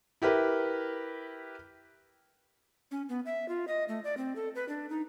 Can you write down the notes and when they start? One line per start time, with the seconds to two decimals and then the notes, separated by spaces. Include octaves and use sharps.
0.22 E4 G4 A#4 B4
2.91 C#4
3.09 B3
3.26 E5
3.49 F4
3.68 D#5
3.88 A3
4.04 D5
4.17 C4
4.36 A4
4.55 B4
4.69 D4
4.90 D#4